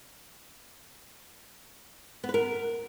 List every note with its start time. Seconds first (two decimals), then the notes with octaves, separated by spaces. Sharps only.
2.24 B3
2.29 B4
2.34 A#4